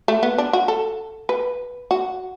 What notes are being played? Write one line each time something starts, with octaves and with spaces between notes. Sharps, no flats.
A3
B3
D4
F#4
A4
B4
F#4